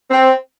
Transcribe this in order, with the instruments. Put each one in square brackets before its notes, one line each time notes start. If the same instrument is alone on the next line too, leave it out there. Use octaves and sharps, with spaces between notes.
[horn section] C4